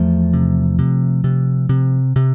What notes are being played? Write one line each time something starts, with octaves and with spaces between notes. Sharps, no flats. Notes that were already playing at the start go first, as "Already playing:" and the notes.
Already playing: E2 F3 A3
C3
C3
C3
C3
C3